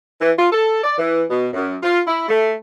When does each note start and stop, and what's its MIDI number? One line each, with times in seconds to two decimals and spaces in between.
0.20 0.31 52
0.37 0.49 65
0.51 0.81 69
0.83 0.98 74
0.98 1.23 52
1.30 1.47 47
1.53 1.75 42
1.82 2.01 65
2.06 2.25 64
2.28 2.52 57